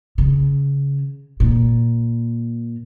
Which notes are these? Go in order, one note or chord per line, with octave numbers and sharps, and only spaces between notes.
C#3
A#2